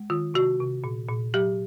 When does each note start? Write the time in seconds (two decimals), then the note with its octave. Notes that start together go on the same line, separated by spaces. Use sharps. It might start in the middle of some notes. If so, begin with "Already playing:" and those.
Already playing: G#3
0.10 D#3 F4
0.34 C3 F#4
0.60 C3
0.84 A#2
1.08 A#2
1.34 F#3 G4